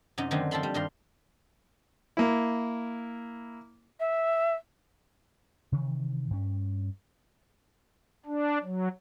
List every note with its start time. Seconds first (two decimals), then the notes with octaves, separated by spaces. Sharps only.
0.18 F#2 C3 D#4
0.31 D3 D#3 F#3 A3 C4 D#4
0.51 F3 C4 A4 A5 B5 C6
0.63 G3
0.74 G2 D#3 F4 G4 C6
2.17 A#3 E4
4.00 E5
5.72 C3 D#3 E3
6.30 G2 C#4
8.26 D4
8.63 F#3